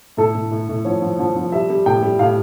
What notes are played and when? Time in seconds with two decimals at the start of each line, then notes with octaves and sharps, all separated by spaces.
0.17 A2 A4
0.35 A2
0.51 A2
0.69 A2
0.85 F3 C#5
1.02 F3
1.19 F3
1.36 F3
1.52 G3 E5
1.70 G3
1.86 A2 G5
2.02 G3
2.19 A2 F5